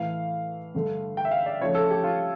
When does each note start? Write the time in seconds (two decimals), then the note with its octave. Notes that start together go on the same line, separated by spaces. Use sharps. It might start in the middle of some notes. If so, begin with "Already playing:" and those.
Already playing: A2 E3 A3 F5
0.75 G2 D3 A3
1.17 G5
1.25 E5
1.31 F5
1.46 D5
1.60 C#3 F3 A3 C#5
1.75 A4
1.90 G4
2.04 F4